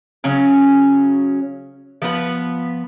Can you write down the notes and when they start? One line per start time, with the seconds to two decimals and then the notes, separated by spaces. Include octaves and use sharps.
0.24 C#3 F#3 C#4
2.02 F3 B3 B4